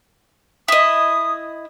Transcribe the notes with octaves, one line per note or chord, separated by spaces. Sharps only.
E4 D#5 D#6